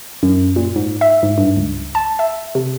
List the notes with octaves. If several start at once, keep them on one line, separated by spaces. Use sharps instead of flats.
F#2
A#2
G#2
E5
G#2
G2
C#2
A5
E5
C3